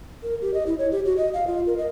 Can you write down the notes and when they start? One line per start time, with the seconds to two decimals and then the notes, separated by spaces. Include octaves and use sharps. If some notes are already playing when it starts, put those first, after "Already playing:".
0.23 A#4
0.42 G4
0.54 D#5
0.67 E4
0.78 C#5
0.92 G4
1.05 F#4
1.17 D#5
1.34 F5
1.47 F4
1.67 A#4
1.78 D#5